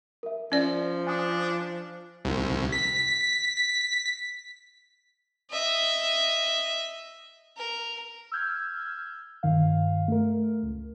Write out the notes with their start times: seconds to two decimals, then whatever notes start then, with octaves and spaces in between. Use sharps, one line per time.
0.23 A#4 E5
0.52 F3 C#4 D5
1.07 D4 G#5 D#6
2.25 C2
2.72 B6
5.51 D#5 E5
7.57 A#4
8.32 E6 F6 G6 G#6
9.43 G2 D#3 F5
10.08 A3 A#4
10.63 C#2